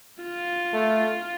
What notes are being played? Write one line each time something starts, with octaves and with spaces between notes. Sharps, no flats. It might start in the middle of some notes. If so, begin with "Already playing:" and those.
F4
A3